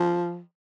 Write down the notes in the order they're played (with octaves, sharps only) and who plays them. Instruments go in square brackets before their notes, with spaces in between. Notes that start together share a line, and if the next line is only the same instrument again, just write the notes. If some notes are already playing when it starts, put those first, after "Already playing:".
Already playing: [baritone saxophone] F3